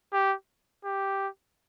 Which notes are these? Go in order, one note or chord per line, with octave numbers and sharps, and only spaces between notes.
G4
G4